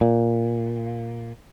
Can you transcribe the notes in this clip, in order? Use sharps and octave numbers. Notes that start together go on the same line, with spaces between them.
A#2